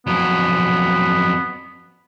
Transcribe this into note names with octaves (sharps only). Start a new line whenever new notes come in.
F2 F#3 B3